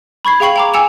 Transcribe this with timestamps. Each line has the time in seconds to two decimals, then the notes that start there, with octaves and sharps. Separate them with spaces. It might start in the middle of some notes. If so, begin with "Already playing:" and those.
0.25 B5 C#6 G#6 C7
0.40 G#4 F5 G5 C#6 C7 F#7
0.56 G5 A#5 D6
0.74 G5 G#5 E6 C#7 E7 F7